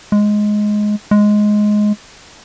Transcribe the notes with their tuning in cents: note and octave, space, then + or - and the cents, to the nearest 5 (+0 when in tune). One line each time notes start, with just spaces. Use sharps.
G#3 +10
G#3 +10